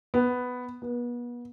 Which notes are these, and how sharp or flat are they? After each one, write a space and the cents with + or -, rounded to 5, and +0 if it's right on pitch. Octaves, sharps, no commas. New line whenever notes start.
B3 +5
B3 -35